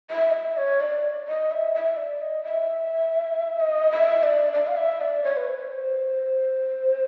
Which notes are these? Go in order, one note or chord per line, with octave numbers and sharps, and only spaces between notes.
E5
D#5
E5
C#5
D5
D#5
E5
E5
D5
D#5
E5
D#5
E5
D5
D5
F5
E5
D5
C#5
B4
C5